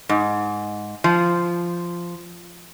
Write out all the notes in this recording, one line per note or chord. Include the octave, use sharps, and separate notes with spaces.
G#2
F3